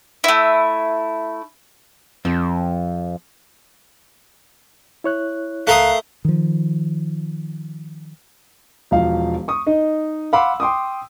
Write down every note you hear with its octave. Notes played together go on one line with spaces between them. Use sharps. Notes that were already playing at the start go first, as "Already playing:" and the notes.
A3 E4
F2 F3 C4
E4 C#5 F#6
C#2 A3 A#4 F5 A#5 D#6 F#6
D#3 F3
E1 F3 F5
C#6 D#6
D#4 D#5
F5 F#5 B5 C6 D6 E6
G5 C6 D6 D#6